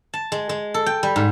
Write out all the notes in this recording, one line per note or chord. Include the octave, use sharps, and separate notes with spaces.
A5
G#3
G#3
A4
G5
G3
G#2